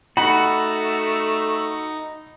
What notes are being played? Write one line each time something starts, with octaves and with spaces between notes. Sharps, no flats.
A3 D#4 F#4 F#5 B5